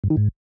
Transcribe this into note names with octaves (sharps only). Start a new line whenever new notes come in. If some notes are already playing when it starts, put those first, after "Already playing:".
G2
D#3
G#2